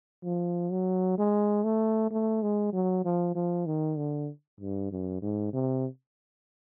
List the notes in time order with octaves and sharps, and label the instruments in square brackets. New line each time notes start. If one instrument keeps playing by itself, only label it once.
[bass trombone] F3
F#3
G#3
A3
A3
G#3
F#3
F3
F3
D#3
D3
G2
F#2
G#2
C3